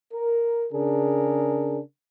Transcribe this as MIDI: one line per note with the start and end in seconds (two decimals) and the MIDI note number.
0.13 0.66 70
0.72 1.80 49
0.72 1.80 62
0.72 1.80 68
0.72 1.80 70